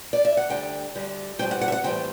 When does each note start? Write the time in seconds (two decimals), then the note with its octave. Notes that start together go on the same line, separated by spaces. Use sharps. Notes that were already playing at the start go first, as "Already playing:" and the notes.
0.13 D5
0.25 E5
0.37 F#5
0.50 D2 D3 G3 G5
0.95 D2 D3 G3
1.39 A2 E3 G3 C4 G5
1.51 F#5
1.61 F#5
1.68 E5
1.72 F#5
1.84 A2 E3 G3 C4 G5